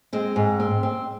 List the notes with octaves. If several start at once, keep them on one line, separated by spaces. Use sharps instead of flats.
G#3 C4
G#2
C4
C4